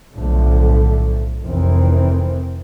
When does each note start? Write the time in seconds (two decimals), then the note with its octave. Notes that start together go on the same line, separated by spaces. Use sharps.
0.14 B1 A2 D3 F3 A3
1.42 F1 D#3 E3 C4